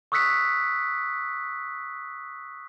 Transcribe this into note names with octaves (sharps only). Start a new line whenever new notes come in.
C#6 D#6 E6 F#6 B6 C#7